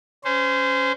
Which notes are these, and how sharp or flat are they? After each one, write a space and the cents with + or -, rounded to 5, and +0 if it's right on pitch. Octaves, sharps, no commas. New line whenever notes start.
C#4 +0 C5 -25